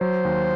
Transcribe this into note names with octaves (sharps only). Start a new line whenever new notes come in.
F#3 C5
D#2